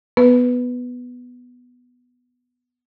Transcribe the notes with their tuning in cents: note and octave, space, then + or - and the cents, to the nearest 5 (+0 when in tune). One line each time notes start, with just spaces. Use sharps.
B3 +0 B4 +0